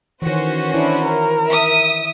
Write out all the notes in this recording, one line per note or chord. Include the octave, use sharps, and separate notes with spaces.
D#3 E3 C#4 F#4 C5
D4 E4
A#4
E5 D#6